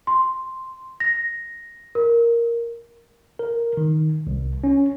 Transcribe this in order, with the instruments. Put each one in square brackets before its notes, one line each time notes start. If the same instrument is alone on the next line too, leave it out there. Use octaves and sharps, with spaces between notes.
[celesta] C6
A#6
A#4
[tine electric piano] A#4
D#3
C2
C#4